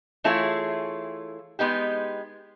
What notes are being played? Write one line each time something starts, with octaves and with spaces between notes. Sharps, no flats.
E3 A3 E4 F4 G#4 C#5
G#3 B3 D#4 G4